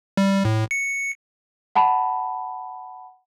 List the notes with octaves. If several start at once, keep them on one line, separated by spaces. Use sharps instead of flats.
G3
A2
C#7
F#5 A5 B5